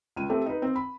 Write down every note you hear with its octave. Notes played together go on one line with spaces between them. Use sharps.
C#2 D#7
A3 C4 G4
D#4 B4
C4
B5